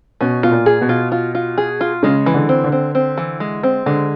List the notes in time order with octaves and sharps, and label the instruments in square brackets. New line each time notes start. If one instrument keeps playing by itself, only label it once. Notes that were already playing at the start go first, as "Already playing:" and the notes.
[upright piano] B2 [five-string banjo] C#4
[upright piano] B2 [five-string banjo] F4
[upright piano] A#2
[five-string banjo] G#4
[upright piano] B2
[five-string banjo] F4
F4
F4
G#4
F4
[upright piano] C#3 [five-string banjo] G#3
[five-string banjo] E3
[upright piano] D3
[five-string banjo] C4
[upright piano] D3
[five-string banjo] C4
C4
E3
G#3
C4
[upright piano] D3 [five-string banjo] G#3